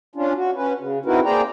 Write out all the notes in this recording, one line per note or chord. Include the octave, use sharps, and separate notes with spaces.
C#4 D4 F4
F#4
C#4 B4
C#3
C4 D#4 E4 F#4 A#4 B4
A#3 G#4 C5 D5 G5 A#5